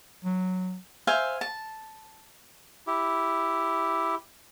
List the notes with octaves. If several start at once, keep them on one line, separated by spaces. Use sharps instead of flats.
F#3
C5 E5 F5 G#5
A5
E4 G4